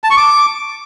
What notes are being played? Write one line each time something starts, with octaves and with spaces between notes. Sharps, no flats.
A5
C#6
D6